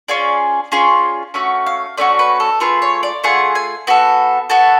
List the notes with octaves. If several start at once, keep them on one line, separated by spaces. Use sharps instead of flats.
C#4 F4 G#4 D5
C#4 F4 G#4
A3 C#4 F#4
F5
A3 C#4 F#4 D5
B4
A4
A3 F4 G#4 B4
C#5
D5
A3 F4 G#4 F#5
G#5
B3 F#4 A4
B3 F#4 A4 A5